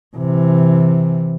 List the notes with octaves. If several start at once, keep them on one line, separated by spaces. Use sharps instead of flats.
C3 E3